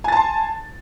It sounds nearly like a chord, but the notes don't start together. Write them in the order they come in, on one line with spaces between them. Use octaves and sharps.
G#5 A6 A5 C6